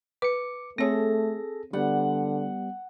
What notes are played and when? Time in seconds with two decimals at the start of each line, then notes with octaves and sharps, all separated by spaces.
0.22 B4 D6 C#7
0.78 A3 C4 G#4 A4 C#5 A#6
1.73 D3 G3 B3 F#5